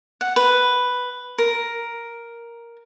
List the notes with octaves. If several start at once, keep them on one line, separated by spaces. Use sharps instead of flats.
F#5
B4
A#4